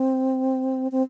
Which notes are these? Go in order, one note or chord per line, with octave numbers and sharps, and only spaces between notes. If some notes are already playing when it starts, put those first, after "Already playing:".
Already playing: C4
C4